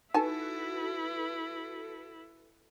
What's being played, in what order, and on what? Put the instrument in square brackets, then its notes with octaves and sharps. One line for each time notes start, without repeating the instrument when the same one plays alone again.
[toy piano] D#4 [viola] E4 [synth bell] F#4 A4 B4 [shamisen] G#5 A5